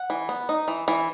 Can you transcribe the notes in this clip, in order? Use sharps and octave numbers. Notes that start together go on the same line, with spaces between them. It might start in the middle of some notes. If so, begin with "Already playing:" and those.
Already playing: F#5
E3
B3
D#4
E3
E3